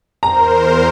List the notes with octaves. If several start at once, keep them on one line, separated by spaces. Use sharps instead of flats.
E2 A#4 C5 A#5